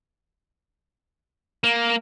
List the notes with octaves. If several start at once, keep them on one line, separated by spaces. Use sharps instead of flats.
A#3